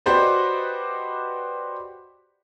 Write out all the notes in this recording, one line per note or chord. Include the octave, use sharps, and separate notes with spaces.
F#4 G4 B4 C5 D5 D#5